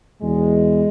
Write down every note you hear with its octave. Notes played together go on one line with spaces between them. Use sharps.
E2 B2 G#3